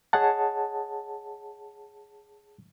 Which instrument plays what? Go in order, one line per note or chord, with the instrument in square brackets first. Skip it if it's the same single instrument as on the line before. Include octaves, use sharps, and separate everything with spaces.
[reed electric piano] G#4 C#5 D#5 F#5 A5